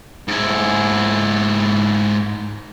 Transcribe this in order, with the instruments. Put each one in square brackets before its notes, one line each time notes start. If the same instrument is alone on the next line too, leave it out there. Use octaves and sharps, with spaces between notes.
[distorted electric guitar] G#2 E4